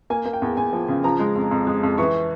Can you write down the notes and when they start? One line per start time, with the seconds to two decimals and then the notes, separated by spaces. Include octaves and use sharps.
0.10 A#3 G#5
0.25 A#3
0.33 G5
0.42 E2
0.57 E2 G#5
0.73 F3
0.88 C#3
1.04 F3 A#5
1.19 G#3
1.36 F2
1.51 F2
1.67 G#3
1.83 F2
1.98 E3 C#6